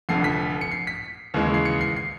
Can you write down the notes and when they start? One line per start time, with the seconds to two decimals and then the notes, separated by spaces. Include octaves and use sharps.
0.09 F1 F2 D3 C7
0.24 B6
0.61 C#7
0.71 C7
0.87 B6
1.34 D#2 C#3 E3 G#3
1.54 C7
1.65 C#7
1.81 C7
1.96 C7